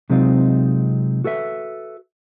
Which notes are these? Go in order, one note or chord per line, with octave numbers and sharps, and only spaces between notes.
C3 F#3 G#3 C4 D#4 F4
F#4 A4 B4 E5